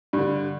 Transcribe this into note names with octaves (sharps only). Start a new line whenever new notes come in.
G2 D3